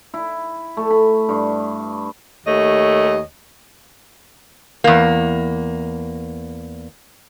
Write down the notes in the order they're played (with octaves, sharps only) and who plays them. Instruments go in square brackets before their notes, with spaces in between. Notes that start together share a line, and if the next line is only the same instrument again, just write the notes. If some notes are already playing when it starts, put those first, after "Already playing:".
[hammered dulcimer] E4
A3
B5
G2
[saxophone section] D#2 A3 C#5 D#5
[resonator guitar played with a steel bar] E2 A#3